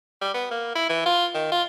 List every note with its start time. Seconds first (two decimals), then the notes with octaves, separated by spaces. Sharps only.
0.21 G3
0.34 B3
0.51 A#3
0.75 E4
0.89 E3
1.06 F4
1.34 D#3
1.52 F4